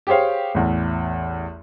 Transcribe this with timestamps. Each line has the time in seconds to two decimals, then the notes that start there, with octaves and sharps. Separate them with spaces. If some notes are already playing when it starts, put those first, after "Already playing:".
0.07 G4 G#4 C5 C#5 F5
0.54 A1 E2